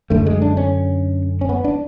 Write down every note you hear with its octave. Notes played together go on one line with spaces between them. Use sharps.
F#2 D3 A3
G#3
D4
C#4
C#4
B3
D4